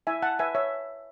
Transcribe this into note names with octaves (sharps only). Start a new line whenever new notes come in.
E4 E5 G#5
F#5 A5
B4 E5 G#5
C#5 E5